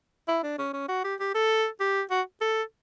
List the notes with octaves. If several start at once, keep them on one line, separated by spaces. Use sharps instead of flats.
E4
D4
C#4
C#4
F#4
G4
G4
A4
G4
F#4
A4